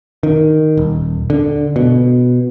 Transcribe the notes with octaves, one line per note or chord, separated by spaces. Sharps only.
D#3
D#1
D3
B2